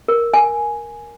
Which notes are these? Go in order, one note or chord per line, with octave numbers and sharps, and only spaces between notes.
A#4
G#5